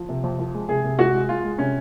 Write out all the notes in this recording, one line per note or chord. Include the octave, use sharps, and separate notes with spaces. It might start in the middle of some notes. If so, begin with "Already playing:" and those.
Already playing: F3
C3
F2
F3
G#3
C3 G#4
C3
G#3 F#4
G#3
G#3 F4
G#3
C3 C#4